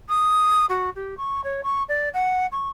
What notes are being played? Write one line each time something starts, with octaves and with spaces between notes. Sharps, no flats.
D#6
F#4
G4
C#6
C#5
C#6
D5
F#5
C#6